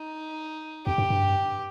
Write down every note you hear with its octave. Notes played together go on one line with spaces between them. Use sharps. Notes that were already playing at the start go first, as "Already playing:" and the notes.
Already playing: D#4
F2 G4
G2
G2